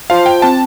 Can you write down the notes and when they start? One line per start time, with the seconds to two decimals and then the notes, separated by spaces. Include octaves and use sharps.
0.10 F4 C5 F5 A5
0.26 G5
0.42 C4 A5